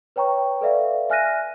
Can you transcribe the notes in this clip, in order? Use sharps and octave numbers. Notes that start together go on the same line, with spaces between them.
B4 C#5 G5 A#5 C#6
A4 B4 D5 E5 F5
E5 G#5 F6 F#6 A#6 D#7